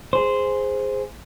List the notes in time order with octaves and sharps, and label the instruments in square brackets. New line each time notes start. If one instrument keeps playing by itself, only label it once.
[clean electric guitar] G#4 C5